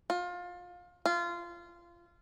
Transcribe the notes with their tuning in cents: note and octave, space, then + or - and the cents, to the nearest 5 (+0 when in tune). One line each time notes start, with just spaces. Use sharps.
F4 +25
F4 -20